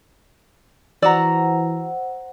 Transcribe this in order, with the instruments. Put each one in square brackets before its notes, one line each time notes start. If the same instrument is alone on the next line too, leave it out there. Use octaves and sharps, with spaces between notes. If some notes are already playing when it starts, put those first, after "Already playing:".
[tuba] E3 [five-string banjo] F#4 D5 [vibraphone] C5 F#5 [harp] A#5 E6